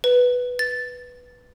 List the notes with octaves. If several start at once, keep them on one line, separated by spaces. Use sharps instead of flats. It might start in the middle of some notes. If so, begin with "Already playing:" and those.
B4
A6